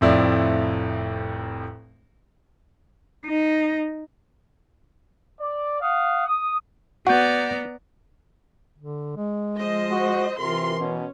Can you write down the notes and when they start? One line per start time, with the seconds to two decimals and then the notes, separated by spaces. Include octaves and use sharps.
0.01 F1 F2 A2 F3 E4 D5
3.26 D#4
5.40 D5
5.81 F5 F#5 D#6
6.27 D#6
7.07 B3 F#4 D5 F#5 A#5 G6
8.78 D3
9.17 G#3
9.58 F3 C5 D#5
9.91 F#4
10.40 C3 E3 F4 A#4 C6
10.80 B2 C#4